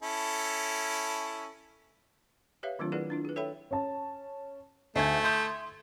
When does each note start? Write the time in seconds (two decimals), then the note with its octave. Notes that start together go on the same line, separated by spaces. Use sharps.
0.03 C#4 E4 A4
2.63 G4 B4 C#5 E5 F5
2.79 D#3 F#3 A3 C4 D4 F4
2.92 E4 G#4 A#4 B4 D5 F#5
3.10 D4 E4 F4
3.25 G#4 B4
3.36 A4 C#5 E5 G5 B5
3.71 C#4 A5
4.96 D2 A3 D#4 G#4 G#6
5.24 E4 C6 D#6 G6